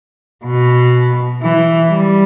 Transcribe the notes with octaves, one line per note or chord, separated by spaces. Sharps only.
B2
E3
G3